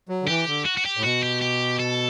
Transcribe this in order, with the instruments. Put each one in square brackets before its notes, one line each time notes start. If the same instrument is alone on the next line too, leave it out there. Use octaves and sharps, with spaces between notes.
[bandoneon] F#3
D3
[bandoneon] E3 [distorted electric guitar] G4
[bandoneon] D3
[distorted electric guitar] F#4
F#4
G4
[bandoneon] A2
[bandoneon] B2 [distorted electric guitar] F#4
[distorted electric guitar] G4
G4
A4